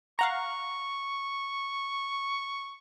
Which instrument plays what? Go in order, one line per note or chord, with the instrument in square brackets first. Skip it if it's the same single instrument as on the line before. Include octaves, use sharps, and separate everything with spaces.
[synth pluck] F5 F#5 A#5 [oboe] C#6